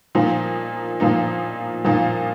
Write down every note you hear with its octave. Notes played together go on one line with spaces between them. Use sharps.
A#2 F3 A#3 D#4
A#2 F3 A#3 D#4
A#2 F3 A#3 D#4